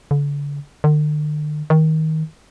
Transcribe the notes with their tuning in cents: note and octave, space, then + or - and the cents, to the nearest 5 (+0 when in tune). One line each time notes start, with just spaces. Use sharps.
D3 -40
D3 +45
D#3 +20